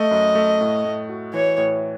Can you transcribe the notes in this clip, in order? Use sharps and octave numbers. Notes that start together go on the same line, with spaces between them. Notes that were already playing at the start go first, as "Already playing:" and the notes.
Already playing: A3 D#5
F#2
A3
A2
A2
F#4
E3 C#5
A2